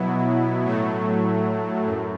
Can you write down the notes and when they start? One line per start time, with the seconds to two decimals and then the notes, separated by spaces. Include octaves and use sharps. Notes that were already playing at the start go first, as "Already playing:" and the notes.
Already playing: B2 F#3 B3 E4
0.64 A2 F#3 A3
1.87 F#2